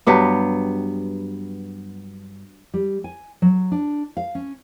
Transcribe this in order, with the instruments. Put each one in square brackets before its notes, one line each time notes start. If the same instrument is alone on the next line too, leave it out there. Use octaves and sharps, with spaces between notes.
[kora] G2 F#3 B3 G4
[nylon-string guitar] G3
G#5
F#3
D4
F5
C#4